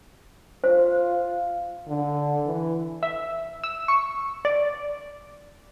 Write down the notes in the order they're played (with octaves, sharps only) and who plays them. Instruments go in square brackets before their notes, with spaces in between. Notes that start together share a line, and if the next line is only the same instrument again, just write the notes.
[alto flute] F4 [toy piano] C5
[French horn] D3
E3
[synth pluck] E5
E6
C#6
D5